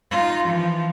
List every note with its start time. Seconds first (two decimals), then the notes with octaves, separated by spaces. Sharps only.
0.11 D#4 F4
0.44 E3 F3